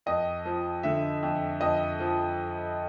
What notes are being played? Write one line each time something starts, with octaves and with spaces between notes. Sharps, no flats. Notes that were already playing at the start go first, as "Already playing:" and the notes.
F2 D#5
F3
D3 E5
F2
F2 D#5
F3